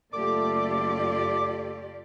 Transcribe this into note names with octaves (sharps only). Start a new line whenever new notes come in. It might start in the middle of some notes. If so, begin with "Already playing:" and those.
F#1 A3 F4 G4 A4 D5 D6